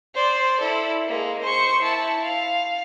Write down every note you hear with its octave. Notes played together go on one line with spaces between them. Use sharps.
C5 D5
E4 A4
G#3 A#3
C5 C#6
E4 A5
F5